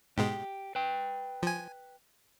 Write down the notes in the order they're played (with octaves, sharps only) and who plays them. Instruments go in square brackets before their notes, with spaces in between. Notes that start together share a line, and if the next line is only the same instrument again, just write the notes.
[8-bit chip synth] G#2 B2 G#3 [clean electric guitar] G4
[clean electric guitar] B4 G5
[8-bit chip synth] F3 G#5